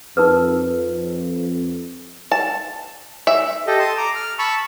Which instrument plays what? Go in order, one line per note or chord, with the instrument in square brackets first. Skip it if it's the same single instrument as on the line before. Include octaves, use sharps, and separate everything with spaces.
[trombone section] F2 [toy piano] D#4 A#4 B4
[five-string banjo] A5
E5
[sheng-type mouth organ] G4 A4 D#5
A5 C6 D#6
A#5 D6
F6
A5 B5 C#6 E6